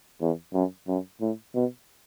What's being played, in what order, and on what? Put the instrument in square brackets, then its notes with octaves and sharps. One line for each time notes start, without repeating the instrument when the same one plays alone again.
[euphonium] E2
F#2
F#2
A2
B2